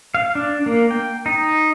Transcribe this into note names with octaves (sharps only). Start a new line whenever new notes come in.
F5
D4
A#3
G5
D#4